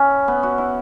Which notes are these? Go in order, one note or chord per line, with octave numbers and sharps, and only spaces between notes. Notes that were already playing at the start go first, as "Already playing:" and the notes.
Already playing: C#4 E4
B3
F#4
E4